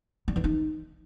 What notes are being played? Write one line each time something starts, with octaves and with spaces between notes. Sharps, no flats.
G3
E3
D#4